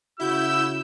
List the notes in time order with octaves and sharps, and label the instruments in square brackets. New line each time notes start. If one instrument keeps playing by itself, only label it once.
[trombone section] C#3 F#4 [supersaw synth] E4 G6 [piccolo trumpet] E6